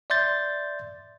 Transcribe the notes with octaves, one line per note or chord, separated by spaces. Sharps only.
D5 E5 C6 G6 A6